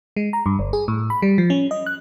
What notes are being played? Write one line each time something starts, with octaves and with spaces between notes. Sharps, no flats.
G#3
A#5
G2
G1
G#4
A2
B5
G3
F3
C#4
D#5
F#6